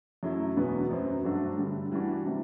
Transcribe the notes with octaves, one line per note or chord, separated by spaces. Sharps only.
F#2 F#3 A3 E4
E2 B2 F#3 B3
F#2 F#3 C4
G2 F#3 A3 D4 F#4
G2 D3 G3
E3 G3 D4 F#4
C3 E3 G3